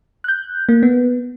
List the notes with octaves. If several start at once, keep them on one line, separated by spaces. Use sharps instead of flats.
F#6 G6
A#3
B3